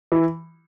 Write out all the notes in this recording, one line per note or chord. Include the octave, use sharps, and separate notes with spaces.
E3